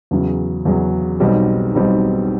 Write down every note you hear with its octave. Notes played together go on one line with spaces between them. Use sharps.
E2 C#3 F#3
E2 C#3 F#3
B1 B2 G3 C4 D#4
B1 B2 G3 C4 D#4